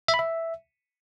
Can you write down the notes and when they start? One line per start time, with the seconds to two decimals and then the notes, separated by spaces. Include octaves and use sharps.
0.08 E5
0.14 B5
0.19 E5